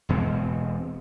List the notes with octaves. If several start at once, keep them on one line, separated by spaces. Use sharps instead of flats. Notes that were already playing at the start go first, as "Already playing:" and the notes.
E1 B2 G#3 C4